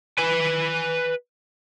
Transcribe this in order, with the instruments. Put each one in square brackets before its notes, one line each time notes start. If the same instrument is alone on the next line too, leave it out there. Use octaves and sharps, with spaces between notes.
[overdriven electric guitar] B4 G#5